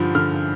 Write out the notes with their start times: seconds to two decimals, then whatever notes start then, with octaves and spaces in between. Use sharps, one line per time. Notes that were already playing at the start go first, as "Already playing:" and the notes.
Already playing: G2 D3 F3 G6
0.15 D3 F6